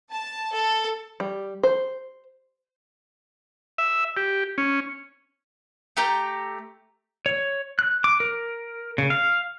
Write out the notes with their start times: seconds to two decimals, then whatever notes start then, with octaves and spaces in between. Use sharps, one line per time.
0.10 A5
0.55 A4
1.20 G3
1.63 C5
3.78 E5
4.17 G4
4.58 C#4
5.97 A3 G4 A#5 G6
7.26 C#5
7.79 F#6
8.04 D6
8.20 A#4
8.98 C#3
9.10 F5